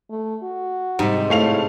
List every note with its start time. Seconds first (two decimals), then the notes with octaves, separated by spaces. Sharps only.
0.10 A3
0.42 F#4
0.99 G#2 C3 G3
1.30 A2 A3 F5 F7